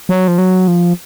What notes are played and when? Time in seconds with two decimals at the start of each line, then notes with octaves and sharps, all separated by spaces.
0.09 F#3
0.28 F3
0.38 F#3
0.68 F3